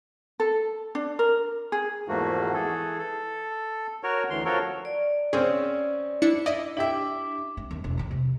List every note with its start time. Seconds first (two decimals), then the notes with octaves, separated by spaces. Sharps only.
0.40 A4
0.95 D4
1.19 A#4
1.72 G#4
2.08 E2 G#2 F3 A3 A#3 F#4
2.53 E3 G#4 A4
2.98 A4
4.03 F#4 A#4 C#5
4.30 D2 E3 C6
4.45 F3 F#4 A4 A#4 C#5
4.85 D5
5.33 C#3 C4 C#4 G#4
6.22 D4 E4 C#7
6.46 E4 D5 D#5
6.77 D4 E4 G4 E5 D6
7.57 C4
7.71 D#2
7.84 E1
7.97 C4 D#4
8.11 C3